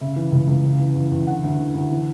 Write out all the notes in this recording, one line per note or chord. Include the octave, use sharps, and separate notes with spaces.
C#3 E5
E3
C#2
C#2
C#3
E3
E2
E2
D3 F#5
D2
D3
D2
E3